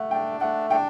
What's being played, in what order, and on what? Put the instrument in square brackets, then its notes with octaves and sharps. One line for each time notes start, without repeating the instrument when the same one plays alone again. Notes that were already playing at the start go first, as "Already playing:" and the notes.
Already playing: [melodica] A3 [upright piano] F#5
[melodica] D4 [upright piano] G5
[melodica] A3 [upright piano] F#5
[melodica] D4 [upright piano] G5